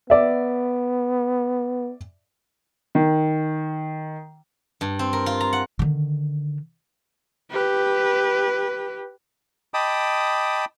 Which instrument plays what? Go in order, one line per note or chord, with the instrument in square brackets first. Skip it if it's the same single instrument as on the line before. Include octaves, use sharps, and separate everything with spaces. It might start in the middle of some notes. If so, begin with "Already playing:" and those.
[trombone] B3 [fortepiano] D5 E5
[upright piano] D#3
[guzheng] G2
C4
A#4
F4
A#5
F#5
[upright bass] D3 D#3
[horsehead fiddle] G4 B4
[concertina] D#5 G5 A5 B5 D6 D#6